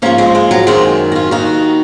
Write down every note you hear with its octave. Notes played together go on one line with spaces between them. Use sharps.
G#2 F3 A#3 C#4
G#3 C4
G#3
F#3
F#2 D#3 G#3 C4
F#4
C#4 F4
D#2 D#3 D#4 F#4